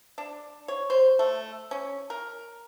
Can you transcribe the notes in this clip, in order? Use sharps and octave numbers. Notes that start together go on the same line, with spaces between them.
D4
C#5
C5
A3
C#4
A#4